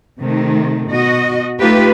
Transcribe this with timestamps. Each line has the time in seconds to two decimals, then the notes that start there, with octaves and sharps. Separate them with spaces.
0.22 C3 D#3 A3
0.89 B2 F#4 D#5
1.59 A3 D#4 F4 G4 B4